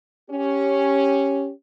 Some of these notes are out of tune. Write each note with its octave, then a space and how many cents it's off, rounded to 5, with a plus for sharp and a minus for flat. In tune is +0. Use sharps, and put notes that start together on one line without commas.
C#4 +0 G4 +0